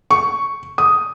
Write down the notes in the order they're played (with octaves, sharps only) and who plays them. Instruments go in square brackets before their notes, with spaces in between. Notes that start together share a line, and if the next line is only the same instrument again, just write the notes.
[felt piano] C#6
D#6